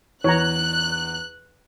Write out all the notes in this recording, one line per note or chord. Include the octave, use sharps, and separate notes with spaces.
E2 C#5 A#5 F#6